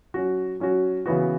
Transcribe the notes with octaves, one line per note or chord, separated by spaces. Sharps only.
F#3 C#4 F#4
F#3 C#4 F#4
C#3 E3 B3 F#4